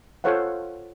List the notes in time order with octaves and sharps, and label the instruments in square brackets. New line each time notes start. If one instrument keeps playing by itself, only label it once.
[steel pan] F4 A4 C5 C#5 F5 F#5